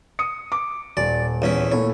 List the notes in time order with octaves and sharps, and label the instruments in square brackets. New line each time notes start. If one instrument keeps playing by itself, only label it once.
[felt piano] D#6 C#7
D6
[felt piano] D#1 [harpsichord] D5
[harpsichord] E2 C#4 E4
[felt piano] A#2 A3 E4 [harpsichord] C#5